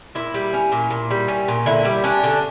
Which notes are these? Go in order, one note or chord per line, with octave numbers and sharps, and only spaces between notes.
A#2 E4
G3
C#4
A#2
A#2
G3
C#4
A#2
D3 E4
G3
C#4 D4
D3